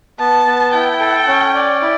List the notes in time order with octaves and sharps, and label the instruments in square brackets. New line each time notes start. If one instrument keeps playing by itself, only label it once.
[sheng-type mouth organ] B3 [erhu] A5
[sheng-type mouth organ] B3
[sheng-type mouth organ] E4 [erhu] G5
[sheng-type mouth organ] A4
C#4
D5
E4